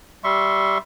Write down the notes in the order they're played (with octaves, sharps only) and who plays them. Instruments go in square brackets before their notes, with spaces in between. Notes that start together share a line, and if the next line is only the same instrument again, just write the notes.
[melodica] G3 E5 C6 C#6